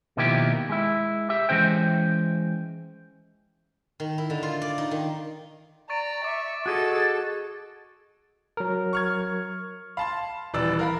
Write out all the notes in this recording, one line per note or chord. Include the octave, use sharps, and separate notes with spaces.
B2 D#3 F3 A#3 E4 G4
G#3 E4
G4 E5
E3 G#3 C#4 C5 G5
D#3
E4
D3
F4
D5
D#4
D#3
D5 A#5 C#6 A6 D7
E5 C#6 D6
F#4 G#4 A4 D#5 A6
F#3 A#4
C#6 F6 G#6
F5 A5 B5 C6
D#1 E3 D5 E6
A#4 F5 B5